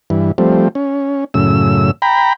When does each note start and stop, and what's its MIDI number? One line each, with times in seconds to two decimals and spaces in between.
0.10 0.32 43
0.10 0.32 52
0.38 0.68 53
0.38 0.68 55
0.38 0.68 57
0.38 0.68 60
0.75 1.24 61
1.34 1.91 42
1.34 1.91 45
1.34 1.91 49
1.34 1.91 88
2.02 2.33 79
2.02 2.33 82
2.02 2.33 83